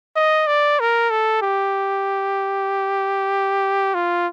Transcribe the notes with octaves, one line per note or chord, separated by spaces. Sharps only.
D#5
D5
A#4
A4
G4
F4